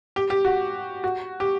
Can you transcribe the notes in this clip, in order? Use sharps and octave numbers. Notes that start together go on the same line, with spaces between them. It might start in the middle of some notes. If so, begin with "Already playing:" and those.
G4
G4
F#4
F#4
G4